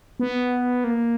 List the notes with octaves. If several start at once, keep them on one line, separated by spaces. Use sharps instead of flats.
B3
A#3